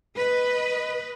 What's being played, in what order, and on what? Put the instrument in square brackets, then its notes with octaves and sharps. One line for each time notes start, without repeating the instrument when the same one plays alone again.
[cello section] B4 D#5